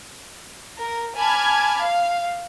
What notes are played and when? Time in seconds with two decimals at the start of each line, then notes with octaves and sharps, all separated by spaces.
0.78 A#4
1.16 G#5 A5 B5 D6 F6 G#6
1.83 F5